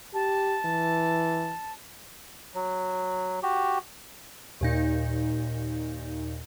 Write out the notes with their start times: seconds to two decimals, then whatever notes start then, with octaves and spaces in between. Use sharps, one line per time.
0.14 G4 A5
0.65 E3
2.55 F#3
3.43 F#4 G4
4.61 D#2 A#2 D#4